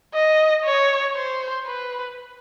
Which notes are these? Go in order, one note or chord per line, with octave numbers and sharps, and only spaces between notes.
D#5
C#5
C5
B4